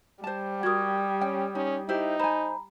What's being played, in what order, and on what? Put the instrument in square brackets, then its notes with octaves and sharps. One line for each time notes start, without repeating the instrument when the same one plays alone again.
[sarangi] G3 [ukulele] C5 A5
[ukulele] F#4 A#4 [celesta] D#6 G#6
[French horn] C#4 [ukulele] G5
[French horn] C#4 [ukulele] D#4
[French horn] D#4 [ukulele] E4 G4 C5
[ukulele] C5 G#5 [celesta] A#5 B5